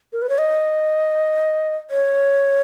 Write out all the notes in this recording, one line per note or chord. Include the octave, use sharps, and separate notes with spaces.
A#4
B4
C#5
D#5
C#5